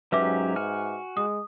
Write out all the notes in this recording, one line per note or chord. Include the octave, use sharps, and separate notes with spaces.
G#2 F#3 C#4 G4 B4 E5 D6
F#4 G#5 F6
G#3 D#6